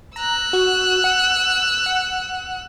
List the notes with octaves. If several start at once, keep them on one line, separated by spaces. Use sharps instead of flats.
A#5 E6 F#6
F#4
F#5
F#5